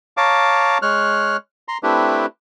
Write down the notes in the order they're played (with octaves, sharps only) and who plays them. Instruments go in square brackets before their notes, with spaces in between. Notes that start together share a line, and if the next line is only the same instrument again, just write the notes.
[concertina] C#5 F5 A5 A#5 D6
G#3 C#5 F6 F#6
A#5 C6
A3 C4 D4 E4 G4 B4